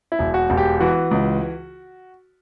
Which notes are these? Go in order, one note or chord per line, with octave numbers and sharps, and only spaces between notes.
E4
E1
F#4
E1
G4
E3 F#4
C#2